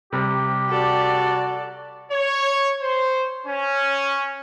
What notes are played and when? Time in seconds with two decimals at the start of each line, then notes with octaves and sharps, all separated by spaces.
0.13 C3 G3 G4
0.69 F#4 A4 D5
2.11 C#5
2.81 C5
3.46 C#4